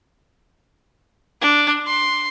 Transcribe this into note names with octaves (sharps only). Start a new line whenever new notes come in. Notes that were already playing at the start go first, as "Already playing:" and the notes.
D4
C6